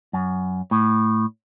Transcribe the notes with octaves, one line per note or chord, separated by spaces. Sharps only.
F#2
A2